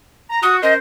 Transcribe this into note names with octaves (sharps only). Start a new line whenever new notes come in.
A#5
F#4 D#6
C#4 A#4 C5 D#5